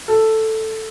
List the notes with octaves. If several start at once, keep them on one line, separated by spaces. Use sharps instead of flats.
A4